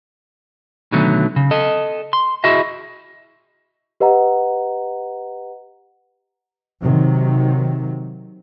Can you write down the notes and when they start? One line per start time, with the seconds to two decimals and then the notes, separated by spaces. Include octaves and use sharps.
0.92 B2 D3 D#3 F#3 A3
1.36 C#3
1.51 A4 D#5
2.13 C6
2.44 E4 F#4 G#4 D#5 E5
4.00 G4 B4 D#5 F#5 A#5
6.83 C3 D#3 F#3